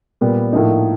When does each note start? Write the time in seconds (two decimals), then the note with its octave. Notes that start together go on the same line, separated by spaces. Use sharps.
0.21 A#2 G3 B3
0.53 A2 F3 A#3 D#4